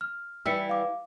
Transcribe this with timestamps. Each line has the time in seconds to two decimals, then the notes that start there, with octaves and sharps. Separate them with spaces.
0.01 F6
0.46 E3 G3 E4 E6 B6 C#7
0.69 F5 D6